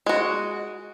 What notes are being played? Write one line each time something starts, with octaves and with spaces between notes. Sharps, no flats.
G#3 F#4